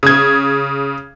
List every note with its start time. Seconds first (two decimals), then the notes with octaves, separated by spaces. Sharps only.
0.03 C#3 G#6